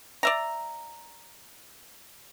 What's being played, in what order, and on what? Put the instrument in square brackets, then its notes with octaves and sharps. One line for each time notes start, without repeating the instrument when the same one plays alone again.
[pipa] D5 E5 A#5